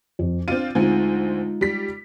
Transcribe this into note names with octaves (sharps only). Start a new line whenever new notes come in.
F2
C4 D4 F4 D#7
D2 G#3 C4 D#4 F4 G#5
G3 B6